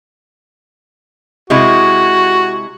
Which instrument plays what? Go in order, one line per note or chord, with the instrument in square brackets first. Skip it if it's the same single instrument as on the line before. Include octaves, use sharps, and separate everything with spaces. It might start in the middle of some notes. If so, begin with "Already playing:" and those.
[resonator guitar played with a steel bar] C3 G#3 E4 [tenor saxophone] F#4